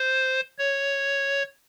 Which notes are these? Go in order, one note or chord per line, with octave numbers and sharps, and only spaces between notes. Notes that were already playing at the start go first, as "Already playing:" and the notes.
Already playing: C5
C#5